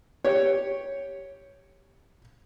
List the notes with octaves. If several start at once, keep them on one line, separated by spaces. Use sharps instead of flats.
G4 C#5